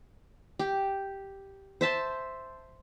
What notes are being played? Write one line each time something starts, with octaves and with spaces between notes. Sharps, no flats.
G4
C5 E5 A5 C6